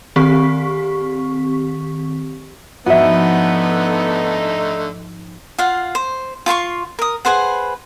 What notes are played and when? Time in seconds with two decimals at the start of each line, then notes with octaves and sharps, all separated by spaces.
0.16 D#3 C4 G4 C#6 B6
2.86 G#2 D3 F3 A3 B3 D#4 F#4 E5
5.58 F4 F5 F#5
5.95 C5
6.46 F4 F5 C6 C#6
6.99 A#4 D#6
7.25 G#4 B4 C5 F#5